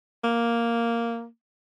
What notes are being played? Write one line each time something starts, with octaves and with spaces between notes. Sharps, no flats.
A#3